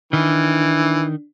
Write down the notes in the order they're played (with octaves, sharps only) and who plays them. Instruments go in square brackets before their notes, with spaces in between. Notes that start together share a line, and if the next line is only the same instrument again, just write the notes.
[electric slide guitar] D#3 [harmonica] E3 [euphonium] D4